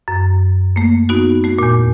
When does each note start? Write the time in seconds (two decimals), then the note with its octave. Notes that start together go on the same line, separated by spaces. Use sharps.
0.08 F#2
0.76 A3 A#3
1.09 B3 D#4 F#4
1.44 A3 F#4
1.59 E2 A#2